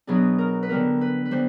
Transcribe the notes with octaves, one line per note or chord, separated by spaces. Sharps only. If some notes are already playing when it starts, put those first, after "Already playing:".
B2 F#3 B3 D4 G#4
A#4
B4
D3 G3 B3 A#4
B4
B4
D3 G3 B3 C5